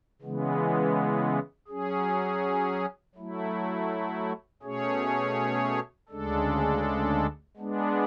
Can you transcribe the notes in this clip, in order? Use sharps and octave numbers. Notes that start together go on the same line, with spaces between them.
C#3 E3 G#3 B3
F#3 C#4 G#4
F#3 A3 E4
B2 A3 C#4 G#4 C#5
D2 C#3 G#3 D4 A4
G#3 B3 D4